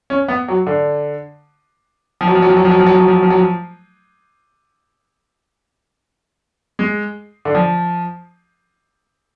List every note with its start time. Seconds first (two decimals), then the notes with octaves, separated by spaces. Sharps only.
0.10 C#4
0.28 B3
0.48 F#3
0.67 D3
2.21 F3
2.27 F#3
2.35 F3
2.42 F#3
2.49 F3
2.57 F#3
2.65 F3
2.71 F#3
2.79 F3
2.86 F#3
2.94 F3
3.01 F#3
3.08 F3
3.16 F#3
3.23 F3
3.30 F#3
3.39 F3
6.79 G#3
7.45 D3
7.55 F3